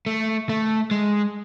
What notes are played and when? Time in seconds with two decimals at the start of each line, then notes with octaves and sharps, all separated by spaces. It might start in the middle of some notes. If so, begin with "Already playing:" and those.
0.06 A3
0.49 A3
0.91 G#3